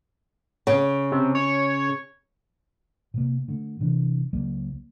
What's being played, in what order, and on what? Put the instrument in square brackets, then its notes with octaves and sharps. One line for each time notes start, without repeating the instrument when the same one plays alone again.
[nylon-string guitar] C#3
[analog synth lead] C3
C#5
[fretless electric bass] C3 A#3
D3 A3
C3 E3 D4
C#2 F#3 A#3